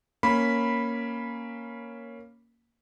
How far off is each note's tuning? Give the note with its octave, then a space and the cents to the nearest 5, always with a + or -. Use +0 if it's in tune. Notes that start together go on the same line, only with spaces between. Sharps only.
A#3 +0 C#4 +0 B5 -5